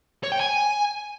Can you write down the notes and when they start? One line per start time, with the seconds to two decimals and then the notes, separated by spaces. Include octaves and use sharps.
0.24 C#5
0.32 G5
0.40 G#5